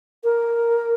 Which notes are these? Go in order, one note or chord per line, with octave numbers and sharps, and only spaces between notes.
A#4